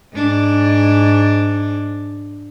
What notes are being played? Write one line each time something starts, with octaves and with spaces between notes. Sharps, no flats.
G#2 D4